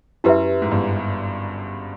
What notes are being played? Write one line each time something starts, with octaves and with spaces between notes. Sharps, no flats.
F#2 E4 G4 B4 E5
G#2
G1 G2